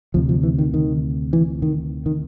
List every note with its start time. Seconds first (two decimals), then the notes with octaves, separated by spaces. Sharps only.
0.14 D2 C3 F3
0.29 F3
0.43 E3
0.58 D#3
0.74 D#3
1.33 E3
1.62 D#3
2.06 D#3